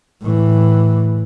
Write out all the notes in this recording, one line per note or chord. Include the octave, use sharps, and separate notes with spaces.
A2 E3